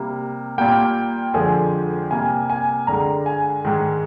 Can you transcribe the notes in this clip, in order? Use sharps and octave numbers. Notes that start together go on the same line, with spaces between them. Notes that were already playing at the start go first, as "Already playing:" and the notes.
Already playing: C3 G3 A#3
A#2 G3 A#3 G5
F2 D3 F3 G#3 G#5
C3 G3 A#3 G#5
G#5
G2 D3 G#3 A#5
G#5
G#2 D#3 G#3